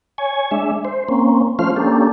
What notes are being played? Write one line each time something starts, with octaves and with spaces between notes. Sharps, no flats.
C#5 G#5
G#3 D4 E5
C5
A#3 C4 C#4
F3 A3 C#4 F4 C5 F6
A#3 C#4 D4 G4 A4